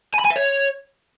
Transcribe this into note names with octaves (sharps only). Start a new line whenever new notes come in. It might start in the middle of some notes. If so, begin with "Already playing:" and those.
G#5
B5
G#5
E5
C#5